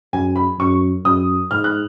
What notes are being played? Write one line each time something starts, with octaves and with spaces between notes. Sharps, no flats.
F#2 G#5
B5
F#2 C#6
F#2 D#6
G#2 F6
F#6